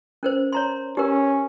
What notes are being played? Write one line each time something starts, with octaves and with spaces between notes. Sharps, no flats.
C#4 A#4 C5
C#5 A#5 C6
C#4 G4 A#4